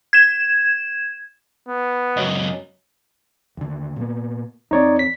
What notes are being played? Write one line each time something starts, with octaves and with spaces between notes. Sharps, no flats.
G#6 E7
B3
C#2 F#2 F#4 C#5 D#5
D#2 D3
A#2 G3 B3
E2 C4 D#4 C#5 D5
B6